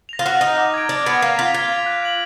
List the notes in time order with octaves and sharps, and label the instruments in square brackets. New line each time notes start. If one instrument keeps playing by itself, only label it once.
[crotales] A#6 F7
[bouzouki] F4
[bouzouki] F#4 [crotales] F6
[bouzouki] D#4 [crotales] A#6 F7
[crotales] D6
G#6 D7
[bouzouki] D4 [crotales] D6
[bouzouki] B3 [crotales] G#6 D7
[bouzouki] A#3 [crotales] G#6
[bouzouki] F4 [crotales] B6 F7
[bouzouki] F4 [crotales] G#6
[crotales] B6 F7
F#6
D7 F#7